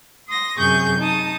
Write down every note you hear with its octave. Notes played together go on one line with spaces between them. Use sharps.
C6 D#6 A#6
F#2 C3 G#4 C#6 G6
D#4 A5 D#6